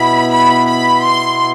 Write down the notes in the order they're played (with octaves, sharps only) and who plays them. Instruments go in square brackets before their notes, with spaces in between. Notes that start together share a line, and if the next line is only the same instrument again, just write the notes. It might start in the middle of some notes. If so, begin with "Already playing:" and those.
Already playing: [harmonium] B2 B3 E4 [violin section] B5
[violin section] B5
B5
C6